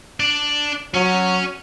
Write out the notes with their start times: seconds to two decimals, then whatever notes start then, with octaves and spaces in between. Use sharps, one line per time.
0.20 D4 D5
0.94 F#3 C#4